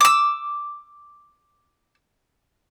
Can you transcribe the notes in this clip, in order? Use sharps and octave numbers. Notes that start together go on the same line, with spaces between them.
D6 E6